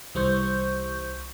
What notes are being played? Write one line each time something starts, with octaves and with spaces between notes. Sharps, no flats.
C2 E3 G3 C5 C#6 G6